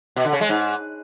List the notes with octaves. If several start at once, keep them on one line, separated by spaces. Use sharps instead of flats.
B2
D3
C#3
G#3
G#2